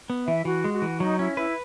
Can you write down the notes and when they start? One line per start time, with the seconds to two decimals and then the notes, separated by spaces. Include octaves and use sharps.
0.10 B3
0.27 E3 E5
0.45 E3 F#4
0.64 G#3
0.73 F#4
0.82 E3
1.00 F#3 D#4
1.18 C#4 E4
1.36 E4 B4